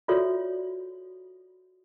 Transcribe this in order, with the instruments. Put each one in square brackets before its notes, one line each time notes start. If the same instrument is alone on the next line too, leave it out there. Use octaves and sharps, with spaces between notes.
[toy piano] F4 F#4 A4 C#5 D5 E5